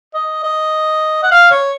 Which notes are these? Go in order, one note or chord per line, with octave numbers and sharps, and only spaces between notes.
D#5
D#5
F#5
F5
C#5